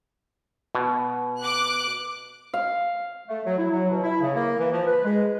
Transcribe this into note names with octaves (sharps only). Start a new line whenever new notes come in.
B2
D6 F#6
F5
A3
F#3
E4
F#3
B2
E4
C#3
A#3
E3
F3
B4
G#3